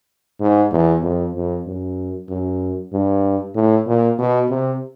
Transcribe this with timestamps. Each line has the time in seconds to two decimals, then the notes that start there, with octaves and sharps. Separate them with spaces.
0.40 G#2
0.72 E2
1.03 F2
1.35 F2
1.67 F#2
2.29 F#2
2.93 G2
3.55 A2
3.87 A#2
4.19 B2
4.50 C3